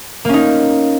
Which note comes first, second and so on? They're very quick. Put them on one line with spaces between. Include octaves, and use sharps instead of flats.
A#3 C#4 D#4